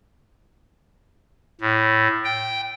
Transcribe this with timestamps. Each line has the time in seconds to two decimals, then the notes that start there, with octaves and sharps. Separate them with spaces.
1.61 A2
2.25 G5